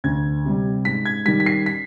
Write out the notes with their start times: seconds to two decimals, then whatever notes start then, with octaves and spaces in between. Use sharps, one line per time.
0.04 D2 G#6
0.45 C3 G3
0.85 G#2 B6
1.05 G#6
1.25 D#3 G3 B6
1.40 B6
1.46 C7
1.66 B6